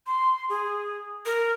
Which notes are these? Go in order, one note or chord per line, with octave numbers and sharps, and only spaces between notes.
C6
G#4
A#4